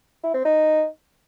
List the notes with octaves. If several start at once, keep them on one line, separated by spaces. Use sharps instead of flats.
E4
C4
D#4